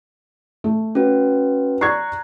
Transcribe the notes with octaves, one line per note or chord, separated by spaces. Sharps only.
A3
C#4 F#4 B4
D5 A#5 C#6 F#6 G#6 C7